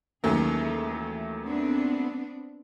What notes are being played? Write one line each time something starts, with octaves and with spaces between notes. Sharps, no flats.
D#2 E3 F#3 G#3 A3 C#4 G#4
E3
B3 C4 D4